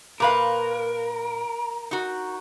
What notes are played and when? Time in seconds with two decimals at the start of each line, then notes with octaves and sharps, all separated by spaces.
0.20 A#2 A#4 B4 F5
1.91 D#4 F#4